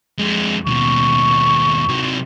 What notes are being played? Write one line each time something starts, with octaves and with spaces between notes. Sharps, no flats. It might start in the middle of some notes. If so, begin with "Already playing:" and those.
F2 G#3
D#2 B2 C#6
C3 F#3